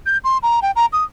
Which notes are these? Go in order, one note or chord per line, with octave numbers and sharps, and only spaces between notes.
G6
C6
A#5
G5
A#5
D#6